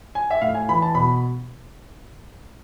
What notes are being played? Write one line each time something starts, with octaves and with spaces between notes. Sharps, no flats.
G#5
E5
A2 F5
G#5
E3 B5
A5
B2 B5